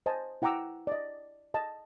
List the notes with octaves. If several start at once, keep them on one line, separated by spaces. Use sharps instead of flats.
C5 D#5 G#5 A5
E4 F#5 G5 A#5 D6 E6
D5 D#5
D#5 A5